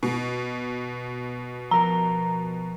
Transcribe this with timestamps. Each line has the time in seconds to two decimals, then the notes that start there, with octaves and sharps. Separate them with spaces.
0.03 B2
1.71 F3 A#4 A#5